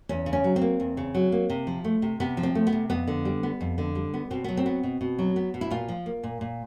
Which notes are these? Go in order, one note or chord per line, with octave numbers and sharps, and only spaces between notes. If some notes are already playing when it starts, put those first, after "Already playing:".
E2 C#4
C#3
C#4
F#3
C4
A#3
E2
C#3
F#3
A#3
C3
F3
A3
C3
C3 B3
F3
C4
A3
B3
C3
F2 B3
D3
G3
B3
F2
D3
G3
B3
B2 C4
F#3 B3
C4
B3
B2
B2
F#3
B3
B2
E4
A#2 F4
F3
A#3
A#2
A#2